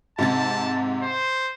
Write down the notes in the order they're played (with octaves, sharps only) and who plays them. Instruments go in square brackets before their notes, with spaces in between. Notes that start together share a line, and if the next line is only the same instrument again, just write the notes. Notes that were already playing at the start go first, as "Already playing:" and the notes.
[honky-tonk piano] G#2 C3 A6 [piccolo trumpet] A5
[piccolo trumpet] C5